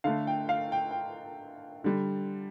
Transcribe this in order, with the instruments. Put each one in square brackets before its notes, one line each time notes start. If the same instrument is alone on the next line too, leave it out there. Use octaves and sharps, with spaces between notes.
[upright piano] D3 A3 F5
G5
F5
G5
G5
D3 G3